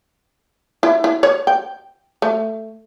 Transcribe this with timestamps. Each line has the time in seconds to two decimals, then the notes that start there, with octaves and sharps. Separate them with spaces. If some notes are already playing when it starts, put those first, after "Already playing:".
0.83 E4
1.04 E4
1.23 C#5
1.47 G5
2.22 A3